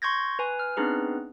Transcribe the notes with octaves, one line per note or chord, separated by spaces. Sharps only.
C6 C#6 G6 G#6 A#6
B4 G#5
F6
B3 C4 D4 D#4 G#4 B4